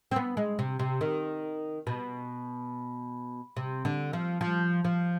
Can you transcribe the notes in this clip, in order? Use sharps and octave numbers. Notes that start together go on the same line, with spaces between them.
C4
B3
G#3
C3
C3
D#3
B2
C3
D3
F3
F3
F3